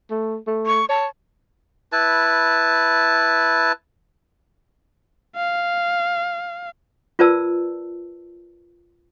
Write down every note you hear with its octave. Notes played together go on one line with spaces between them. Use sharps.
A3
A3
C#6
C#5 A5
E4 B4 A5
F5
F4 A#4 B4 D5 A5 E6